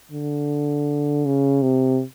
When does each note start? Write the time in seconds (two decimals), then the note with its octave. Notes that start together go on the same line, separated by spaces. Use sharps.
0.12 D3
1.25 C#3
1.62 C3